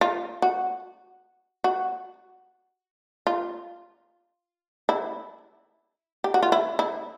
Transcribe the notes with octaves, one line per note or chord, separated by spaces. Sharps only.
F4
F#4
F#4
F4
E4
G4
F#4
F4
E4
E4